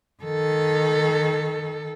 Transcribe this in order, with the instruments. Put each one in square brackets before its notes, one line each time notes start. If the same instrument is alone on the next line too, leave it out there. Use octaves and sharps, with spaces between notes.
[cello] D#3 A4